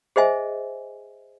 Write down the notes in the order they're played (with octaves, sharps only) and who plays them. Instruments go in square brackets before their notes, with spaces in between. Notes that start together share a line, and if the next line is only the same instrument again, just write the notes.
[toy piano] G#4 C5 D#5 E5 G#5